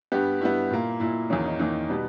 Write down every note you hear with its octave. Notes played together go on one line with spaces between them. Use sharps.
G2 G3 B3 G4
G2 G3 B3 E4
A#2 A#3
A#2 A#3 E4
E2 D#3 A#3 C#4
D#4
E2 D#3 A#3 D#4
B2 G3 B3